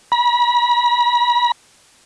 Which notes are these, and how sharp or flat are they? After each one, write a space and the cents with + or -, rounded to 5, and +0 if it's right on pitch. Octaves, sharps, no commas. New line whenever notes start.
B5 -40